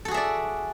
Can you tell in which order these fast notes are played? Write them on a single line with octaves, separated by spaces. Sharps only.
A4 F#4 G#4 E5 D5